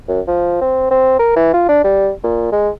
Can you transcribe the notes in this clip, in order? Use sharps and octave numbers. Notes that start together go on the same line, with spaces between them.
F#2
F3
C4
C4
A#4
E3
F4
D4
G3
A#2
G#3